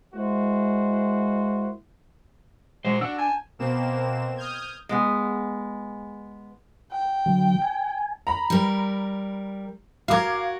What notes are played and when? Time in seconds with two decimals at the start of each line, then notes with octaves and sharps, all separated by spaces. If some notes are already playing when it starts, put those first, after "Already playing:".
0.14 G#3 A#3 E4 F#4 C5
2.85 A#2 G#3 F#4 C5
3.01 D4 D5 F#5 E6
3.18 G#5 A5
3.59 B2 A#3 C4 E7
4.37 D#6 F6 G6 G#6
4.89 G#3 B3 G#4
6.92 G5
7.26 D3 F#3
7.62 G#5
8.27 A#5 B5
8.50 G3 A#4
10.08 F#4 A#4 F5 D6 G#6